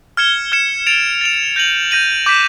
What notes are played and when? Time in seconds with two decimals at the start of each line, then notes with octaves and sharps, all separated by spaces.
0.17 F6 G#6 C#7 E7 G7
0.52 F6 G#6 C#7 E7 G7
0.87 A6 D7 F7
1.21 A6 D7 F7
1.56 G6 A#6 D#7 F#7
1.91 G6 A#6 D#7 F#7
2.26 D6 G6 B6 E7